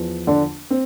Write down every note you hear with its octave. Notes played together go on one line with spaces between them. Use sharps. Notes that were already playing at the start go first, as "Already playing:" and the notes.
Already playing: E2 F3
D3 D4
C4